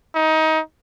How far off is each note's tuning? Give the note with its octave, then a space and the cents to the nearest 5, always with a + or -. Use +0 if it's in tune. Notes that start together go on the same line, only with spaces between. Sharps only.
D#4 +25